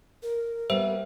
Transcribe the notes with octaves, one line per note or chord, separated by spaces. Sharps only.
A#4
G3 A#3 B3 C5 E5